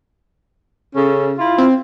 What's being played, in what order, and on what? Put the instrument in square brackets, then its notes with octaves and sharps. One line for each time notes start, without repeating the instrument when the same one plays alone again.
[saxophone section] C#3 C#4 A4
E4 F4
[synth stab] C4